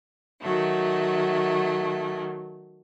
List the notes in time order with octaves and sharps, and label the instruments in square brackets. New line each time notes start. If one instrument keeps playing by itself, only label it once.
[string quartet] D#3 F#3 A3